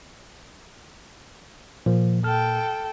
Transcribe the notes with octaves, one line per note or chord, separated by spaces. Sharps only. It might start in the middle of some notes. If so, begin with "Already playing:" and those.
A#2 F3
A4 G5 F6